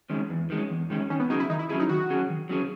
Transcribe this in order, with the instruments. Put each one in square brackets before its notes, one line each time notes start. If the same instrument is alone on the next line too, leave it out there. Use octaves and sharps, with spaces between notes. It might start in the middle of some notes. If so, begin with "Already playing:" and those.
[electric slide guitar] D#3 G#3 C#4
E2
D#3 G#3 C#4
E2
D#3 G#3 C#4
[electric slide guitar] D#3 [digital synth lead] C#4
[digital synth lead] B3
[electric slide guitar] F#3 C#4 G#4 [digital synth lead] D#4
[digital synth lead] E4
[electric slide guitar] D#3 [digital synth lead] D#4
[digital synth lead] E4
[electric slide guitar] F#3 C#4 G#4 [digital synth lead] E4
[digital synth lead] D#4
[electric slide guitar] D#3 [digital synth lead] F#4
[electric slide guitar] F#3 C#4 G#4
D#3
F#3 C#4 G#4